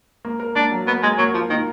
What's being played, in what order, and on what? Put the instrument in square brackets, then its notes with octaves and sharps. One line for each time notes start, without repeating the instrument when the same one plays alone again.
[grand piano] A#3
A#4
[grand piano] A#3 [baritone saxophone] D4
[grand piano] F#3
[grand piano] A#3 [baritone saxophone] B3
[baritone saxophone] G#3 [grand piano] A#3
[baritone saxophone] F#3 [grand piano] A#3
[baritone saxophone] F3 [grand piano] F4
[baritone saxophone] D#3 [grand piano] A#3